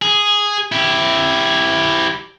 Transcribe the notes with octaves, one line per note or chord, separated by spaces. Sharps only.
G#4
E4 G4